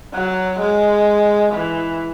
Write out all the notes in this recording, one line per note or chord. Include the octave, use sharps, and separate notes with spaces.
F#3
G#3
E3